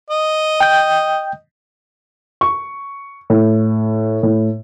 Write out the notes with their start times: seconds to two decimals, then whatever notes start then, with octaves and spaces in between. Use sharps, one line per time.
0.10 D#5
0.60 G5 G6
2.41 C#6
3.30 A2
4.23 A2